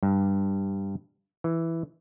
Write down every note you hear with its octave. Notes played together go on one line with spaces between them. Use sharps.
G2
E3